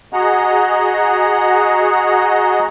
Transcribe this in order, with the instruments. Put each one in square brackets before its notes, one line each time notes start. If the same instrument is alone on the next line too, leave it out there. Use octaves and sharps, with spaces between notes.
[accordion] F#4 G#4 D#5 F#5 A#5